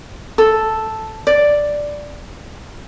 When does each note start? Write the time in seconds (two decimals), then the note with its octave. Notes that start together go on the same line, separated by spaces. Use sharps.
0.38 A4
1.27 D5